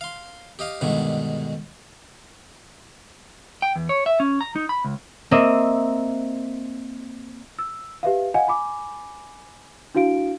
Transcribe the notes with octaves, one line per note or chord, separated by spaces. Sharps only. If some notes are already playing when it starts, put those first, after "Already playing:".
F5 C6
G4 D#5 F5
G2 B2 D3 D#3 G#3
G5
E2
C#5
E5
C#4
A#5
D#4
B5
C#2
A#3 C4 D#5 E5
E6
G4 B4 E5 F5
D#5 F5 F#5 G#5
G#5 B5 D6
D4 E4 F#4 F5 D7